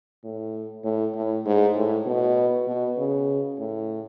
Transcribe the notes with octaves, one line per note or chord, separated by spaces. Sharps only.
A2
A2
A2
G#2
A2
B2
B2
C#3
A2